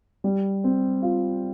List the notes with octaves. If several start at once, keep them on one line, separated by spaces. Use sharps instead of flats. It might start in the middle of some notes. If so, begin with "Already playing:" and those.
G3
C4
F4